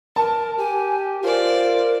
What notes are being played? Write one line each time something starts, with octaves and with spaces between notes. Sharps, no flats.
A#4 A5
G4 G#5
F4 A#4 C5 D5